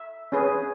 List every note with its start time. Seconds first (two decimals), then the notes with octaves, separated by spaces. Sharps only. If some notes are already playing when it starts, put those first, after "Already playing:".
Already playing: E5
0.32 C#4 G#4 B4